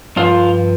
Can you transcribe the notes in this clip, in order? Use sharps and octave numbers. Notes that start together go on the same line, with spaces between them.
G2 F3 F4